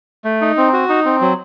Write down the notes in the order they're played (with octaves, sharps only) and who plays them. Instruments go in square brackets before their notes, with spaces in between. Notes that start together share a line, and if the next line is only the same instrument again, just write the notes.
[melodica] A3
D#4
C4
F#4
D#4
C4
F#3